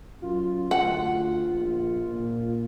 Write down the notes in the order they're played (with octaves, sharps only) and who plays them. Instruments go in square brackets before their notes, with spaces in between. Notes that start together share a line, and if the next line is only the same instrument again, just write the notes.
[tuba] F#2 [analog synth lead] F4
[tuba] D2 [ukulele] F#5
[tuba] A#1
A#2